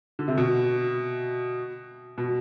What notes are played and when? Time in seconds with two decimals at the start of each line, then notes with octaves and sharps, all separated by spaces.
0.19 D3
0.28 C3
0.37 B2
2.18 B2